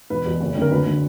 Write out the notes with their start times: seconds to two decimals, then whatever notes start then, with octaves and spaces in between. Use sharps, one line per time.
0.10 E1 B4
0.25 E2 B2
0.41 F#1
0.55 F2 D3
0.62 A#4
0.71 D2 B4
0.86 D3